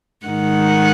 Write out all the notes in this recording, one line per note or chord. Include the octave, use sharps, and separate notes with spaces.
G#2 D#3 F#5